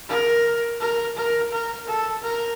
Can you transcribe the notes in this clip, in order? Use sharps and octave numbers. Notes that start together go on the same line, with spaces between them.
A#4
A#4
A#4
A#4
A4
A#4